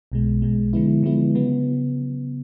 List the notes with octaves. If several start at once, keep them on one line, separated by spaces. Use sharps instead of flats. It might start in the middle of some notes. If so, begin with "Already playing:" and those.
B1 B2 G#3
B1 B2 G#3
D3 F3 G#3 B3 E4
D3 F3 G#3 B3 E4
C#3 F#3 B3